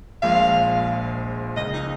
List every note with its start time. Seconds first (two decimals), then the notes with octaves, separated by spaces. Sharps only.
0.22 A#1 A#2 F3 G#3 F5
1.57 C#2 C#3 A#3 D#5
1.74 D#4